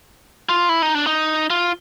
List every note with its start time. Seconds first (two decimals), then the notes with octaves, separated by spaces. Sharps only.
0.49 F4
0.69 E4
0.82 D#4
0.95 D4
1.07 D#4
1.50 F4